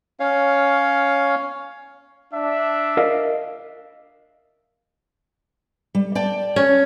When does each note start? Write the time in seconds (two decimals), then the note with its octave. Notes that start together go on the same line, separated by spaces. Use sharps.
0.20 C#4 C#5 F5
2.34 D4 E5
2.97 A#4 D#5 F5
5.95 G3
6.15 D5 G5 A5
6.56 C#4